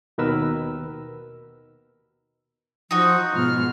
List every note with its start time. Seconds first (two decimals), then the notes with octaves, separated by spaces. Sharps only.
0.18 D#2 B2 D#3 A#4 B4 E6
2.91 F3 D#4 F#4
3.32 G#2 B2 F4 F6